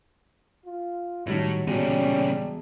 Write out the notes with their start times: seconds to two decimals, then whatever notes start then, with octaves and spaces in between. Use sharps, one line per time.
0.65 F4
1.27 A2 D#3 F#3 G3 C#5
1.67 E1 A#2 C#3 F#3 G3 C#4 D#7